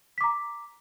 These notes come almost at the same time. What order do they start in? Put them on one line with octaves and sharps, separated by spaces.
B6 D6 A#5